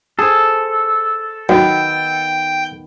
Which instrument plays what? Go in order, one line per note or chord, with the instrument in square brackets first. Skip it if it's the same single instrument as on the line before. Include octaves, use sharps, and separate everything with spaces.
[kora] G#4 C5 [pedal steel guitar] A4
[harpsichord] F#2 [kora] D#3 B3 [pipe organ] G5